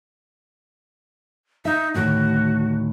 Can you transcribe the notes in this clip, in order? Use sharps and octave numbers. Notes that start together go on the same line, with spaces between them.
D#4 E5
D2 A2 D#3 F#4